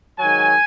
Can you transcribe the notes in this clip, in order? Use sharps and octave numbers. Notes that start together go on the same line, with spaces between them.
G#2 D#3 F#3 G#5